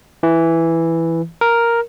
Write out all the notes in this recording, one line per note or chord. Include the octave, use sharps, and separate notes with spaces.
E3
A#4